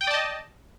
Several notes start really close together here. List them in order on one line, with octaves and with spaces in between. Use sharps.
G5 D#6 D5 A5 D#5